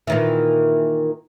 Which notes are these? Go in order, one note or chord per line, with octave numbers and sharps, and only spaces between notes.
A#2 D#3 E3